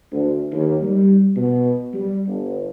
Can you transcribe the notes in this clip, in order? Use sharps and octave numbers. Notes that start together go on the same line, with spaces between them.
D2
D#2
G3
B2
G3
G1